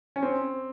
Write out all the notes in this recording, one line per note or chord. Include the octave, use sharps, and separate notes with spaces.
C#4
C4